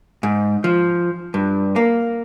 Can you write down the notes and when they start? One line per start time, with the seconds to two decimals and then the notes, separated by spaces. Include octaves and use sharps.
0.23 G#2
0.64 F3
1.34 G2
1.76 A#3